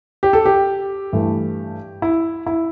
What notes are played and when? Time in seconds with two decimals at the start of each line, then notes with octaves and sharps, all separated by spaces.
0.23 G4
0.33 A4
0.46 G4
1.13 G2 E3 A3
2.02 E4
2.46 E4